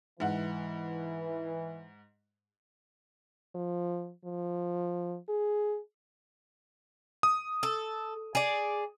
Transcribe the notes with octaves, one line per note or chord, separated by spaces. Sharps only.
G#2 E3 F#5
F3
F3
G#4
D#6
A4
G#4 D5